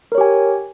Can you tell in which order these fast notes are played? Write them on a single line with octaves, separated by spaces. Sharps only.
A#4 C#5 G4 G#5